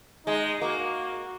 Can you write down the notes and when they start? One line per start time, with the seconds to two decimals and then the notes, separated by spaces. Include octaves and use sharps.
0.26 G#3 D#4
0.61 A#3 F#4